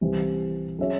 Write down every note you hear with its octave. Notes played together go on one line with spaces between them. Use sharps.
C2 C3 E3 C4 E4
F#3 C#4 G#4 C#5 E5